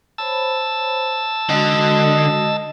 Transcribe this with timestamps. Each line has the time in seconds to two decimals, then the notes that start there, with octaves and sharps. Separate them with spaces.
0.18 C5 C#5 A5 B5 E6
1.50 D3 G#3 F#4 D#5